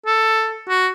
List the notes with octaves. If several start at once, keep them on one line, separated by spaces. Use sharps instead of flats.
A4
F#4